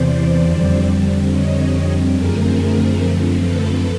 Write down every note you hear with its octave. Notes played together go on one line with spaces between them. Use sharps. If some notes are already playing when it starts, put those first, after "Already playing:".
Already playing: E2 C3 E3 C5 D5
F2 D3 G3 C4
C#5 D#5
F#2 D3 F3 A3 C4 G#4 A#4
A4 B4